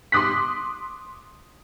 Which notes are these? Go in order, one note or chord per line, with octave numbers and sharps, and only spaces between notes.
C6 D6 D#6 F#6 B6